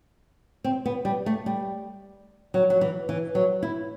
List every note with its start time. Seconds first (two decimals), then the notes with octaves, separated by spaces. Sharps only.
0.64 C4
0.86 B3
1.05 G3
1.26 A3
1.46 G3
2.54 F#3
2.70 F#3
2.81 E3
3.09 E3
3.35 F#3
3.63 E4